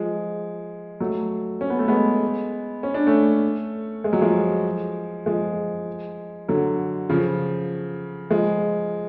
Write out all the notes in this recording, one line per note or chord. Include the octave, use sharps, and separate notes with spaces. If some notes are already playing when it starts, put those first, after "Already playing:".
Already playing: F3 G#3
F#3 A3
C#4
B3
A3
G#3 B3
C#4
D4
A3 C#4
G#3
F#3
F3 G#3
F3 G#3
D3 F#3
C#3 F3
F3 G#3